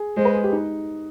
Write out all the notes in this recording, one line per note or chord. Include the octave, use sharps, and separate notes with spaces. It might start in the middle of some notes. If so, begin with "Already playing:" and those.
Already playing: G#4
G#3 C5
B4
G#4
G4
D#4